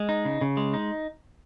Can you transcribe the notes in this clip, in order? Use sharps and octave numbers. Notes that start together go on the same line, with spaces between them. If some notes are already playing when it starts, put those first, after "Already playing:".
Already playing: G#3
D#4
C#3
C#3
G#3
D#4